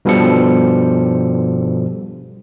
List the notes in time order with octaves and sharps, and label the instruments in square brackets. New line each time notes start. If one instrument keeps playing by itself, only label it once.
[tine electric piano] G2 B2 F3 G3 A4 C#7